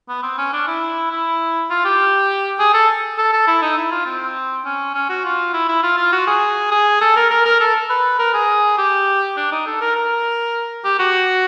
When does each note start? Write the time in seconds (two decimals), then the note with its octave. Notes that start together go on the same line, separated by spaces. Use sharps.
0.09 B3
0.23 C4
0.38 C#4
0.53 D4
0.68 E4
1.11 E4
1.70 F4
1.85 G4
2.59 G#4
2.74 A4
3.18 A4
3.33 A4
3.47 E4
3.62 D#4
3.77 E4
3.91 F4
4.06 C4
4.65 C#4
4.95 C#4
5.10 F#4
5.25 F4
5.54 E4
5.69 E4
5.83 F4
5.98 F4
6.13 F#4
6.27 G#4
6.71 G#4
7.01 A4
7.16 A#4
7.30 A#4
7.45 A#4
7.60 A4
7.90 B4
8.19 A#4
8.34 G#4
8.78 G4
9.37 D4
9.52 D#4
9.67 A4
9.81 A#4
9.96 A#4
10.84 G4
10.99 F#4